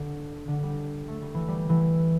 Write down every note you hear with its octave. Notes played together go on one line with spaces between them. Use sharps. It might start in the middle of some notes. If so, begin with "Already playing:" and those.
Already playing: D3
D3
G3
A3
G3
E3
G3
E3